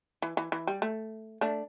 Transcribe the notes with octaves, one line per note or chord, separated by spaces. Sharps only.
E3
E3
E3
G3
A3
A3 D4